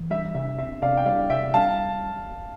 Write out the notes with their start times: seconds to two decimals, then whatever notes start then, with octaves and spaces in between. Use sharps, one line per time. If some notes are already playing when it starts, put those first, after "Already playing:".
Already playing: E3
0.10 G3 E5
0.34 C3 E5
0.58 C4 E5
0.82 C3 D5 F5
0.97 G5
1.06 G3 D5 F5
1.30 C3 E5 G5
1.54 G3 F5 A5